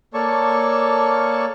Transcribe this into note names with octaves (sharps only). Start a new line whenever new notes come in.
A#3 A4 C#5 D5 A5 C#6